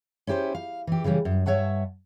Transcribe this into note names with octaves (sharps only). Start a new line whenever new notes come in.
C#4 E4 G4 A4 C5
F5
E3 G4
C#3 E3 G3 C#4
F#2
G2 C#5 E5 F#5 A5